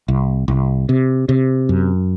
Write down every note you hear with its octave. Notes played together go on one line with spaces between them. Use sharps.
C2
C2
C3
C3
F#2